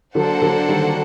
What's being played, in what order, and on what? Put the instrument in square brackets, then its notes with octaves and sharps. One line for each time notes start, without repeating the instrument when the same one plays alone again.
[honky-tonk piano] D3 F#3 [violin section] A#3 D4 A4 C5 F#5
[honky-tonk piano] D3 F#3
D#3 G3